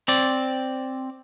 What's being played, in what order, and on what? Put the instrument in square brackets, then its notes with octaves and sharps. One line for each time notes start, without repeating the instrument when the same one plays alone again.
[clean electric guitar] C4 D5